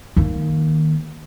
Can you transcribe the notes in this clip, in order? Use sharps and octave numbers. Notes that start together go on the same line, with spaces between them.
D#3 A#3